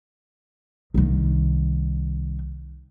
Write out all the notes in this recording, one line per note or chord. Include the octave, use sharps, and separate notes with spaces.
C2 D#3